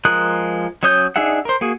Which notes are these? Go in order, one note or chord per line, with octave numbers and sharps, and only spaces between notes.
F3 G#3 A#4 D#6 F#6
F#3 C#4 C#5 D#6 G6
D4 D#4 G#4 E5 F#5
A#4 C5
A#3 F#4 G#4